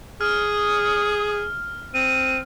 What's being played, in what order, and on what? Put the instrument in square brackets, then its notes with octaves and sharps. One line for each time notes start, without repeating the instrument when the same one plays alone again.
[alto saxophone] G#4 [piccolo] D#6 [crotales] F6
[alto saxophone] C4 [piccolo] D#7